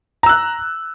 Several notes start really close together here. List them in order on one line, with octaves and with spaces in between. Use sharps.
A#5 E6 F#6